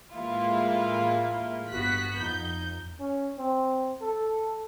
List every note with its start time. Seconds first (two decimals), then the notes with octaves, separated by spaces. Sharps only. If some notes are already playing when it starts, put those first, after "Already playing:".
0.15 A2 E3 G#3 A#3 E4 F4
1.69 G1 B3 F#4 F#6 B6
2.19 F2 D#4 G6
3.00 C#4
3.38 C4
4.01 A4